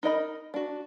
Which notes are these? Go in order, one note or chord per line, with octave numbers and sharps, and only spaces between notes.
D#4 A#4 D#5 B5
D4 F#4